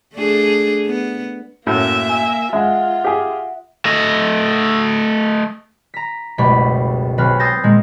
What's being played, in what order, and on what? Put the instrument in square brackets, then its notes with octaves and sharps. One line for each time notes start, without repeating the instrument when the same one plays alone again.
[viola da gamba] A3 D4 G#4
B3
[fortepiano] F#2 A2 [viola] A#3 E5
[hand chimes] G#5
[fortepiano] G#3 [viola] F4 [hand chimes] E5 F#5
[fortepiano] G4 G#4
[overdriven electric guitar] A3 D#5
[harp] A#5 B6
F#1 C#2 B2 A3 G4 B5
B1 C4 B4 F6
C6 D#6 E6 G6 A6 A#6
A#2 G#3 A#3